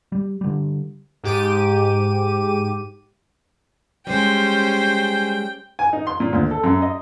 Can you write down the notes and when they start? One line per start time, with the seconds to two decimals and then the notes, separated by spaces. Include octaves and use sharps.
0.12 G3
0.41 D3 G3
1.23 G#2 G4 D6 D#7
4.07 G3 G#3 C#4 C5 G5
5.79 G#5
5.93 D#4
6.07 C6
6.20 A#2
6.33 D2
6.51 A4
6.64 F#2
6.82 D#5